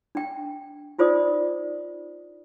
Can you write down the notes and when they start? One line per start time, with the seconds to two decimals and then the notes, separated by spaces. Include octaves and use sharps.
0.15 D4 G5
0.98 D#4 F4 C5 D5 D#6